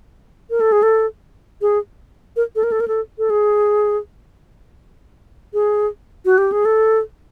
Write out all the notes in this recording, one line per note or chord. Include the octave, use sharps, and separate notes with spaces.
A#4
A4
G#4
A4
G#4
A#4
A4
A#4
A4
A#4
A4
A4
G#4
G#4
F#4
G4
G#4
A4